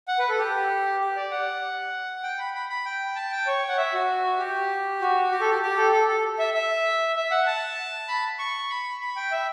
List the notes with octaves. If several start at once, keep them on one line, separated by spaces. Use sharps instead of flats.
F#5
B4
A4
G4
G4
D5
F#5
G5
B5
B5
B5
G5
A5
G5
C#5
F#5
E5
F#4
G4
F#4
G4
A4
G4
G4
A4
A4
A4
E5
E5
E5
F#5
A5
B5
C#6
B5
B5
G5
E5